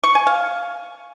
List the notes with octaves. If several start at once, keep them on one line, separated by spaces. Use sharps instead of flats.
C#6
G#5
F5